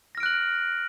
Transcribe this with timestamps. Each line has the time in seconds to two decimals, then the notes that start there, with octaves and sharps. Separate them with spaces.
0.15 A#6
0.18 F6
0.20 D7
0.23 F#6
0.26 F#7